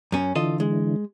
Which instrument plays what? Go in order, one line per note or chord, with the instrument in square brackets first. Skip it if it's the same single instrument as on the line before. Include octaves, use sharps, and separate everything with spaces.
[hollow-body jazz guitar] F#2 C#4
[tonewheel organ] D3 E3 [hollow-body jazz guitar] F4 A4 D#5
[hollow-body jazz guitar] G#3